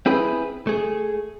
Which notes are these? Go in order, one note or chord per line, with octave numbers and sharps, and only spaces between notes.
C4 E4 G#4 B4
A3 G#4